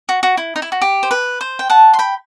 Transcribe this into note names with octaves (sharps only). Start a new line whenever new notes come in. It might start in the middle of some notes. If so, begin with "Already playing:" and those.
F#4
F#4
E4
D#4
E4
F#4
G4
C5
B4
C5
G5
F#5 A5
C6
G5 B5